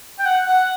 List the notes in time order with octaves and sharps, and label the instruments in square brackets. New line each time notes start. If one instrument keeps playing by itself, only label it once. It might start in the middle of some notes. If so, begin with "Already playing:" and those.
[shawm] G5
F#5
F#5